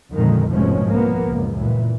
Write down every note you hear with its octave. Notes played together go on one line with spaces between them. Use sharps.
F2 A#2 D3 D#3 G#3
F1 G#2 B2 F3 G#3 C#4
C2 F3 A#3 B3
C#2 F#2 A#2
A#2 E3